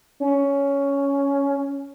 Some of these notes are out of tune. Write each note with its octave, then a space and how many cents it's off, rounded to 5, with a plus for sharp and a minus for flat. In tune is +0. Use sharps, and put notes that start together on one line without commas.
C#4 +10